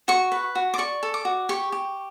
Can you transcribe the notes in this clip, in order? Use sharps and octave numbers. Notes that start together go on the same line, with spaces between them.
F#4 C#6
B4
F#4
D6
D5 C#6
A4
D6
F#4
G4 C#6
G4